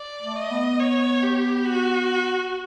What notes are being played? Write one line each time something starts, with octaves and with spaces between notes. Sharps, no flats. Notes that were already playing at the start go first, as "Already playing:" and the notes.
Already playing: D5
A3
D#5
B3
C#5
G4
F#4